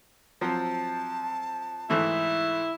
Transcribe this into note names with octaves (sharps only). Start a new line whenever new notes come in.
F3 F#3 C4 A5
G#2 E3 A3 E4